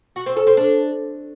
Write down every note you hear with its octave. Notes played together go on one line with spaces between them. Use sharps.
F#4
C4
A4
C4
D4